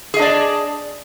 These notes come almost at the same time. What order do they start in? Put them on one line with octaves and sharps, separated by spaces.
G#4 D#5 D4 D5